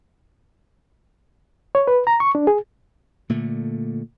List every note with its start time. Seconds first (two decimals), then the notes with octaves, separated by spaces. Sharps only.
1.75 C#5
1.88 B4
2.07 A#5
2.20 C#6
2.35 D4
2.47 G#4
3.30 A#2 D3 A3